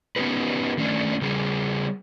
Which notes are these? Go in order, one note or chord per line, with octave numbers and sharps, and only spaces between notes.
B3 C#4 D#4 G4 B4
D#3 A3 C#4 D4
C#3 G3 G#4